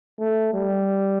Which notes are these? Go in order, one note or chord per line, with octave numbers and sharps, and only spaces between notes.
A3
G3